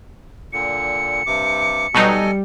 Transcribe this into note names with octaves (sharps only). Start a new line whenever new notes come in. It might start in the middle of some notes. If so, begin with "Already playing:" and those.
A#2 D3 C#7
G2 C3 D6
B2 F#3 G3 D#4 A4 D#5 G#5